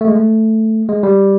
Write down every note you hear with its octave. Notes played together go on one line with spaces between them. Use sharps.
A3
G#3
A3
G#3
G3